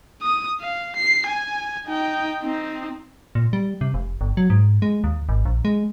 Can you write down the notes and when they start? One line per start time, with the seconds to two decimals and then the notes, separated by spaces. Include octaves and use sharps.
0.22 D#6
0.61 F5
0.97 C7
1.27 G#5
1.87 D#4 G5
2.43 C4 D#4
3.35 A#2
3.53 G3
3.81 C3
3.94 F1
4.21 G1
4.37 F#3
4.50 G#2
4.82 G#3
5.04 D#2
5.29 G#1
5.45 A#1
5.65 G#3